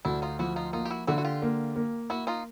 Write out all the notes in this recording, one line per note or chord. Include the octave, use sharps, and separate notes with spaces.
D2 D4 E4
D#4 F4
F3 E4 F#4
D#4 F4
A#3 D#4 F4
G4
E4 F#4
D3 E4 F#4
F#4
F4 G4
A#3
A#3
A#3 E4 F#4
D#4 F4